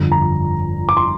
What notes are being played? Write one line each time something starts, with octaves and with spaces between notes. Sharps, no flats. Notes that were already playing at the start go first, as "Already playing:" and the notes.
Already playing: G1 F2 D3
A#5
D6
C6